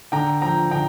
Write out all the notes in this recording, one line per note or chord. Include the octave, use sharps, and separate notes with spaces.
D3 G5 A#5
F3 G5 A#5
D3 G5 A#5